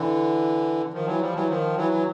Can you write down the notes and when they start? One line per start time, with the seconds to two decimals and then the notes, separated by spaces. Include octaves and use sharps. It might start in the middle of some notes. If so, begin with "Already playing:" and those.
Already playing: D3 E3
0.93 D#3 F3
1.07 E3 F#3
1.21 F3 G3
1.35 E3 F#3
1.50 D#3 F3
1.77 E3 F#3
1.94 F#3